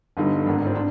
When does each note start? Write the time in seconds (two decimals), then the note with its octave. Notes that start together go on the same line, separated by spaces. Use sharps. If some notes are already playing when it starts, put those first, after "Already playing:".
0.17 G1 G2 D3 D#4
0.46 G#1 G#2 D#3 D4
0.66 C4
0.75 D4